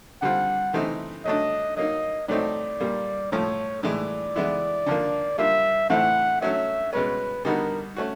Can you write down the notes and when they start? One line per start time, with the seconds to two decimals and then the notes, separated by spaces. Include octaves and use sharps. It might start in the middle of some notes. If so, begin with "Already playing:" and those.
0.22 D3 G3 C4 F4 F#5
0.73 C3 E3 A3 C4 D#4
1.25 F#3 A3 D4 D#5
1.77 F#3 A#3 D#4 D#5
2.28 A2 F#3 A3 C4 D#4 D5
2.80 A#2 G3 A#3
3.32 A2 F3 A3 C#5
3.83 A2 E3 G#3 D5
4.36 E3 G#3 B3 E4
4.86 D3 F3 A#3
5.38 G3 A#3 D4 F4 E5
5.90 A2 E3 A3 C4 E4 F#5
6.41 F#3 A3 C#4 F#4 E5
6.93 B2 G#3 C#4 B4
7.45 D3 G3 B3 D#4 F#4 A#4
7.96 A3 C#4 F#4